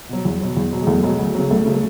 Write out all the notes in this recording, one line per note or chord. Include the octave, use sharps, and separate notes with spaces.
B2 F#3
E2
B2 F#3
E2
B2 F#3
G#3
E2 A3
B2 F#3 G#3
D2
C#3 F#3
D2 A3
C#3 F#3
A3